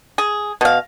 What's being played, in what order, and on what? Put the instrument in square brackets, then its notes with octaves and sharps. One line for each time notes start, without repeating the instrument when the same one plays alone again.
[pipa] G#4
B2 F5